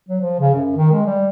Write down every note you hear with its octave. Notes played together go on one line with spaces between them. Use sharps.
F#3
F3
C#3
F#2
D#3
G#3
G3